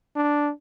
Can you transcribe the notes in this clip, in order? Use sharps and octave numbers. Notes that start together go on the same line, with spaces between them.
D4